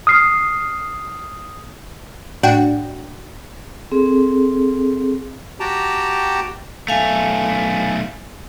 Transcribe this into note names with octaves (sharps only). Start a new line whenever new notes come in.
D#6 F6 C7
A2 D4 F#4 F#5 G5
C4 G#4 A4
F#4 G4 G5 A5 A#5
B1 A3 F5 G#5